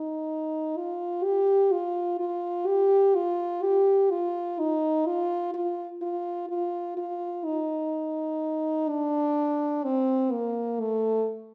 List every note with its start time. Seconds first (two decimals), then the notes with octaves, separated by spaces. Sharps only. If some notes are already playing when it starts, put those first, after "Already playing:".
Already playing: D#4
0.77 F4
1.24 G4
1.72 F4
2.20 F4
2.67 G4
3.16 F4
3.63 G4
4.11 F4
4.59 D#4
5.06 F4
5.54 F4
6.02 F4
6.50 F4
6.98 F4
7.45 D#4
8.89 D4
9.84 C4
10.32 A#3
10.80 A3